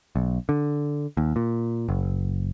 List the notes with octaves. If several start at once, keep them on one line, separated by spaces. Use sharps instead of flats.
B1
D3
D#2
A#2
F#1